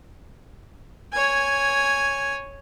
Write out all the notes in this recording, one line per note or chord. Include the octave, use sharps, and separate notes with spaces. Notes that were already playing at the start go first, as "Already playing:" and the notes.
C#5 G#5